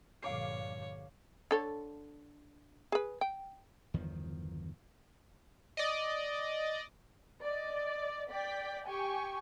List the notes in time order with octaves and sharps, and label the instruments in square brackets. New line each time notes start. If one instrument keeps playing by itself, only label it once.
[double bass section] A#1 G2 D3 [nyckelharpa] C#5 [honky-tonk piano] F5 D6 C7
[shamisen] D3 A4 C#5
G#4 B4
G5
[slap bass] G1 E2 D#3 F3
[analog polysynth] D5 D#5
[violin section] D5 D#5
D5 G5 B6
G4 G5 G#5 C#6